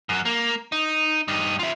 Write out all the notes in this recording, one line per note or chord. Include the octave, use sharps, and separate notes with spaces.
F#2 F#3
A#3
D#4
G2 D#4
F4 E5